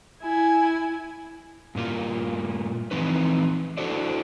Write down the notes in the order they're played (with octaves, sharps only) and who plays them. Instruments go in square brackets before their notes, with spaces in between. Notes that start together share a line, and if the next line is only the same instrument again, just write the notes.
[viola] E4 G#5
[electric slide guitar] G2 A#2 A#3 F4
E3 F3 C4 D#4 B4
D4 E4 F#4 A4 C5 D5